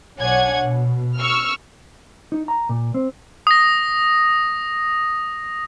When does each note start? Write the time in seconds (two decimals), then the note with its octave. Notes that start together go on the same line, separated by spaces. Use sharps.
0.18 B1 D4 C#5 F#5 G#5 G#6
0.58 B2
1.17 C#6 E6 F6
2.32 D#4
2.48 A#5
2.69 A#2
2.94 C4
3.47 D#6 A#6